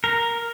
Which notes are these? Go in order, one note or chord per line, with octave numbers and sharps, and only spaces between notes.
A#4